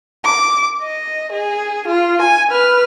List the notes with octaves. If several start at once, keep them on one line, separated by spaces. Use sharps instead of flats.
D6
D#5
G#4
F4
G#5
B4 F6